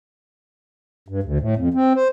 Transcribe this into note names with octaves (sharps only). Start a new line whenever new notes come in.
G2
D2
A2
F2
C4
C5